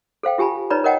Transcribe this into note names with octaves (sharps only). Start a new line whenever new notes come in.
A4 C5 F5 G5
F4 G4 G#5 A5 B5
D#4 B4 C#5 D5 A#5 B5
A#4 C#5 D#5 F#5 G5 A5